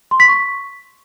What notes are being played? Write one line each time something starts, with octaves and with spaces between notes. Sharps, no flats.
C6
B6
C#6